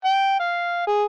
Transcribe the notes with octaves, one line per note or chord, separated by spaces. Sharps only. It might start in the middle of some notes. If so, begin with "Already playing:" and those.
G5
F5
G#4